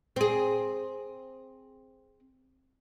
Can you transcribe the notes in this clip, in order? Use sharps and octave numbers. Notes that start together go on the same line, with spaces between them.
C4 G#4